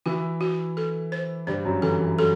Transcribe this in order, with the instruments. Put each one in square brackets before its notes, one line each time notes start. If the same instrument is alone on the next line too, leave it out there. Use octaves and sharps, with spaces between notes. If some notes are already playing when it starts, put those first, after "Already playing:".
[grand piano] E3 E4 [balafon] F#4
[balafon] F#4
A4
C5
[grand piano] G2 G3 [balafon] C5
[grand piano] F#2 F#3
[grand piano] E3 [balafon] A4
[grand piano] E3
[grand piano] F#3 [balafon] A4